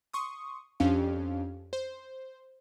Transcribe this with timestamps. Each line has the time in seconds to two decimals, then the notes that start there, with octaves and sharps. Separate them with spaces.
0.13 C6 C#6 D#6
0.80 F2 C#4 D4 G4 F5
1.73 C5